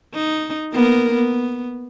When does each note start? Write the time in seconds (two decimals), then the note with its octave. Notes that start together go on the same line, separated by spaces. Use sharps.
0.14 D#4
0.73 A#3 B3 A#4
1.14 B3